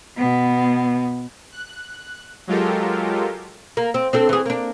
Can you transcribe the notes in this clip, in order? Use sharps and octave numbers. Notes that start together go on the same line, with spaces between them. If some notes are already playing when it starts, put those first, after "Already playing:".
B2 B3
F#6
F#3 G#3 F4 G4 A4 A#4
A#3
C4
C4 D4 A4
E3 G#4
A#3 D4